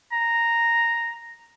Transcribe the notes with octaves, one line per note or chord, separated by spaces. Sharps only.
A#5